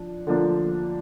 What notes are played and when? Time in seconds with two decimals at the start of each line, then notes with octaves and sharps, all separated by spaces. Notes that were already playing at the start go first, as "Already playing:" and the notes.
Already playing: F3 D4
0.27 D3 F3 A#3 D4